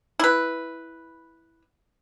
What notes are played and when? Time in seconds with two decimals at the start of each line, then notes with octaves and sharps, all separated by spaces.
0.19 E4 B4